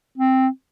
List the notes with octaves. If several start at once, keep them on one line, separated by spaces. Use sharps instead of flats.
C4